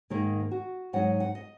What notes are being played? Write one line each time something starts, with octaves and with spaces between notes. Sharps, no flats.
G#2 D#3 A#3 D#4 A#4
F#4
G#2 F#3 D#4 F#5
F#5
D#5